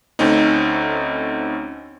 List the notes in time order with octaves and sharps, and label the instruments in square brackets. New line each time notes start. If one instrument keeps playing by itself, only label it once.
[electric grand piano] D2 A3 C4 C#4 D#4